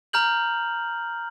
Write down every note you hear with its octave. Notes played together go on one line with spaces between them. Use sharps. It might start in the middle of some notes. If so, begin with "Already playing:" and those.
A#5 F6 G6 F#7